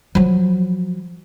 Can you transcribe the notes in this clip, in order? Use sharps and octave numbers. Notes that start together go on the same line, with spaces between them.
F3 F#3